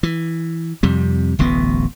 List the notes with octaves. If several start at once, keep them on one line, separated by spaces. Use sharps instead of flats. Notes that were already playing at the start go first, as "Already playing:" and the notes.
E3
F2 C3 G3
D1 A1 B2 B3